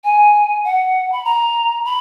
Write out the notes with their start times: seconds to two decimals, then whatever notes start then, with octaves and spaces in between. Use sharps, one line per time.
0.04 G#5
0.64 F#5
1.12 B5
1.25 A#5
1.85 B5